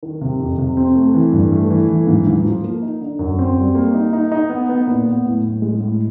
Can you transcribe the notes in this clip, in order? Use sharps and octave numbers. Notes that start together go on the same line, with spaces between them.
D#3
C3
F2
C3
C4
A3
E3
G2
A3
E3
E3
G#2
G#2
F3
A#3
D#4
D3
F#2
C4
G3
A#3
D#4
D#4
D#4
B3
B3
A#2
B3
A2
A2
G#3
A2